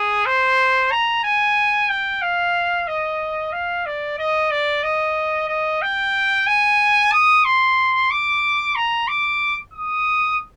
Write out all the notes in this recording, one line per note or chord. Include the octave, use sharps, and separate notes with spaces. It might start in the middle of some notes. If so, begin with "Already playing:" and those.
Already playing: G#4
C5
A#5
G#5
G5
F5
D#5
F5
D5
D#5
D5
D#5
D#5
G5
G#5
D#6
C6
D6
A#5
D6
D#6